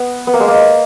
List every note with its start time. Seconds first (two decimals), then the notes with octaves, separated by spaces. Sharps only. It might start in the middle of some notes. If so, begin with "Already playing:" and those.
Already playing: B3
0.27 B3
0.34 A#3
0.40 G#3
0.48 A#3